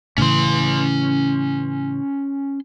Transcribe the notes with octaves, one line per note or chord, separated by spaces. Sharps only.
A2 C#3 E3 C#4 C6